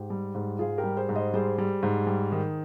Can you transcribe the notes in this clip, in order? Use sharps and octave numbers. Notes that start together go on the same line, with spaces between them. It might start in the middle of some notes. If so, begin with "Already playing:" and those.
Already playing: G#2 G4
G3
G#2
G#2 F4 G#4
G4 A#4
G3
G#4 C5
G#2
C5 D#5
G3 G#4 C5
G3
G#2
G3
D#3